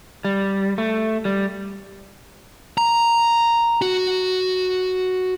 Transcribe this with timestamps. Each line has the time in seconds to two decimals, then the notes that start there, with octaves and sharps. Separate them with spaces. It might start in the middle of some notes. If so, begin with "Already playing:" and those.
0.25 G3
0.78 A3
1.25 G3
2.78 A#5
3.82 F#4